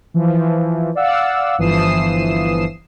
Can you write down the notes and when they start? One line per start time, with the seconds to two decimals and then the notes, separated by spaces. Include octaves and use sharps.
0.14 E3 F3
0.95 D5 F5 F#5 E6
1.58 G1 E3 F3 D#6 C7 E7